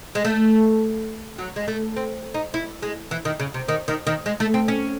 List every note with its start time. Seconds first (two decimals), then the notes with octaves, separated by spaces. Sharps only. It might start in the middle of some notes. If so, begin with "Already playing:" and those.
0.15 G#3
0.25 A3
1.38 F#3
1.56 G#3
1.68 A3
1.96 C4
2.34 D#4
2.54 E4
2.82 G#3
3.11 E3
3.25 D#3
3.40 C#3
3.54 C3
3.68 D#3
3.88 D#3
4.07 D#3
4.26 G#3
4.40 A3
4.54 C4
4.68 C#4